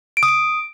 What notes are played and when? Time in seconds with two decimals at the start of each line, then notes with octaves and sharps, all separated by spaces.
0.17 D7
0.23 D#6
0.28 D7